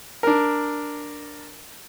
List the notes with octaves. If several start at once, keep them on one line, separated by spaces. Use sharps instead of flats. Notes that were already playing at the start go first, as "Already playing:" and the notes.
D4 A#4